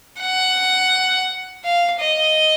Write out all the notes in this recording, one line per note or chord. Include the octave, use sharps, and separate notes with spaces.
F#5
F5
D#5